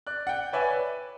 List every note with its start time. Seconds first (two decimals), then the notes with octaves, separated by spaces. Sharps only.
0.07 D5 F#6
0.27 F#5 G5
0.53 B4 C#5 D5 E5 G#5
0.71 B4